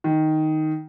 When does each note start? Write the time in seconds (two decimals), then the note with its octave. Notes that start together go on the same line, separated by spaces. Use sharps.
0.04 D#3